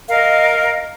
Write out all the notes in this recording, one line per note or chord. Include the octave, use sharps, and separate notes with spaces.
A#4 D#5 F5